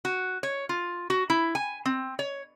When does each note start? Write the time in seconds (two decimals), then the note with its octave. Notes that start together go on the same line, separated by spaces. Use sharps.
0.05 F#4
0.43 C#5
0.69 F4
1.10 F#4
1.30 E4
1.55 G#5
1.85 C4
2.19 C#5